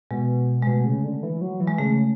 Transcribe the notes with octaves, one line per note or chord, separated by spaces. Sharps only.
B2 G#3
G#3
B2 A3
C#3
D3
E3
F#3
E3
G#3
C#3 A3